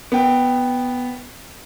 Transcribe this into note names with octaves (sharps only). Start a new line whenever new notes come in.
B3 G5